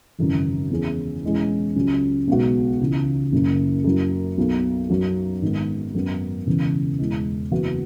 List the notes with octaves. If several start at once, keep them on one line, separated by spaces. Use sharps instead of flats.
G#1 F#2 C#3 E3
E2 E3 C#4 G#4
E1 E2 E3 G#3 C#4
C#2 C#3 F#3 C#4
B1 B2 G#3 B3 F#4
C#2 C#3 E3
F#1 F#2 C#3
F#2 F#3 E4
B1 B2 F#3
F#2 F#3 C#4 F#4
G#1 G#2 G#3 B3
F#2 F#3 B3
E1 E2 C#3 E3
E1 E2 E3 G#3
F#1 E2 E3 B3 F#4